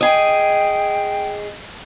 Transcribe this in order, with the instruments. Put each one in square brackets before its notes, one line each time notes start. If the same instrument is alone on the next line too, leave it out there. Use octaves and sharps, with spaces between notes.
[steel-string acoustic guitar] G#4 D#5 [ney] G5